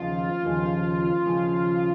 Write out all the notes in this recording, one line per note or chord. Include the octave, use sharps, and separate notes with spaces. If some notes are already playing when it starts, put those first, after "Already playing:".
Already playing: D#2 C#3 F3 F4
D#2 C#3 F3
D#2 C#3 F3